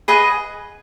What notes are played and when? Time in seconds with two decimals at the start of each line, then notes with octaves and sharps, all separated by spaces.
0.08 G#4 B4 D#5 F#5